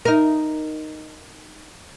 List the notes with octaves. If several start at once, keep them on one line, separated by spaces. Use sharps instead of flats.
D#4 A#4